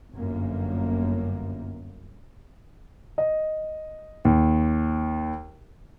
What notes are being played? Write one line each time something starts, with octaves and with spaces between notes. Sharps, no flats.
G1 F#2 A#3
D#5
D#2